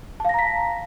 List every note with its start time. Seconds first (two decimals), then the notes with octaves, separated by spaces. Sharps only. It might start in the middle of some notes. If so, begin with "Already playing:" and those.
0.20 A5
0.25 F5
0.29 A#6
0.34 A#5
0.39 B6